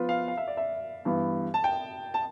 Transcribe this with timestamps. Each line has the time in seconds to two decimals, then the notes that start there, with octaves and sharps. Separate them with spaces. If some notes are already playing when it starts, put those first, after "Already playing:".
Already playing: F3 B3 F4 B4
0.09 F5
0.28 F5
0.38 E5
0.48 D5
0.57 E5
1.05 G2 E3 B3
1.54 A5
1.64 G5
2.14 A5